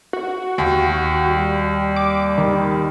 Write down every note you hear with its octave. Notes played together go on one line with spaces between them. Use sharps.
F#4
D#2
G3
D6
D#3